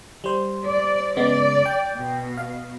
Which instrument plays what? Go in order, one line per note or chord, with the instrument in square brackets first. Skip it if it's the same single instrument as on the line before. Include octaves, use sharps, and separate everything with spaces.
[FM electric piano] G3 C5
[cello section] D5
[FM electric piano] C#3 G#3 B3 [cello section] D5
[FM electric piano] G5
[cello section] B2
[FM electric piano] F5